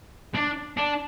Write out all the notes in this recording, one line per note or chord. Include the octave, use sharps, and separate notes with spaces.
D4
D4